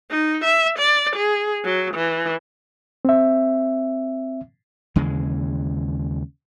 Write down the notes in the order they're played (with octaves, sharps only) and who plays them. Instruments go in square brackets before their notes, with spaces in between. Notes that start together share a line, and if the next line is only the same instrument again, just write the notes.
[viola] D#4
E5
D5
G#4
F#3
E3
[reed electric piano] C4 E5
[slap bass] D#2 C#3 E3 G#3